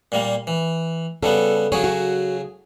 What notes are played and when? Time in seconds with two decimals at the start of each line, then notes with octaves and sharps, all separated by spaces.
0.12 A#2 G3 A#3
0.47 E3
1.23 C#3 G3 B3 A4
1.72 C#3 F#3 G#4 C#5
1.84 F#4